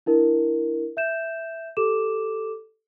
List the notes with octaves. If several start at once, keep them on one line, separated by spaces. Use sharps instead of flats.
D4 E4 A#4
E5 G6 E7
G4 A4 D6 E7